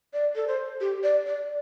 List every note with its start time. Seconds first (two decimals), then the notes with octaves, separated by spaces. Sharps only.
0.14 D5
0.36 A4
0.48 C5
0.81 G4
1.03 D5
1.26 D5